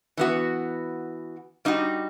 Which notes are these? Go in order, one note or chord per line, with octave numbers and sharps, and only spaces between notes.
E3 B3 F#4
G3 D#4 F#4